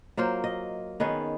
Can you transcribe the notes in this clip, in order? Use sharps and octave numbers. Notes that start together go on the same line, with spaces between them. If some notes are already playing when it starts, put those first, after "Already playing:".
F#3 A#3 F4 C5
D#5
D#3 B3 C#4 G#4